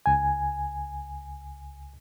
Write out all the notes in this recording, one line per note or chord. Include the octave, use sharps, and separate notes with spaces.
C#2 G#5